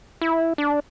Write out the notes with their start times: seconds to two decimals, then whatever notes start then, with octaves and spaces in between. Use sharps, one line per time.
0.21 E4
0.58 D4